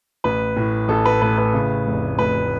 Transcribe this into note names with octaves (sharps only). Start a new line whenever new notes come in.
A1 B4
A2
A1 A4
B4
A2 B4
B4
C#3
F1
F1 B4